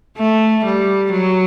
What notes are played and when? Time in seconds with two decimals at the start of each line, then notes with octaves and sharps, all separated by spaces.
0.17 A3
0.65 G3
1.11 F#3